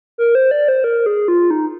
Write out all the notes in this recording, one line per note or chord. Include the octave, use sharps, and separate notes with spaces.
A#4
C5
D5
C5
A#4
G#4
F4
D#4